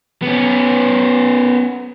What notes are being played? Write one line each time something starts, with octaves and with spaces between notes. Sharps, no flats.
B3 C#4